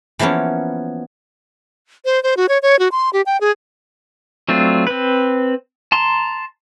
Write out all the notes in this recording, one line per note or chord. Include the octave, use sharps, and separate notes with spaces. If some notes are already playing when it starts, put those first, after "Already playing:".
E3 F3 A#3 B3 C#4
C5
C5
F#4
C#5
C#5
F#4
C6
G4
G5
G#4
F#3 A3 C4 D4 F4
C4 B4
A5 A#5 C6